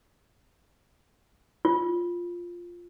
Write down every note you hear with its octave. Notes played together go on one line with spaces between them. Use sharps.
F4